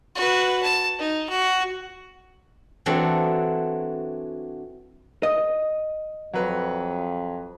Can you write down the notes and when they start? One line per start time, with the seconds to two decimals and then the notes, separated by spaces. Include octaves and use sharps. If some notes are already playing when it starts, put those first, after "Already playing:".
0.15 F#4 B4
0.62 A5
0.99 D#4
1.29 F#4
2.86 E3 F#3 A3 C4 D4 F#4
5.23 D#5 D#6
6.33 F2 F#3 B4